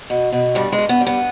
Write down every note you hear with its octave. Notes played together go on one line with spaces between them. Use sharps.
B2
B2
G2 G3
G#3
G2
B3
G3
B3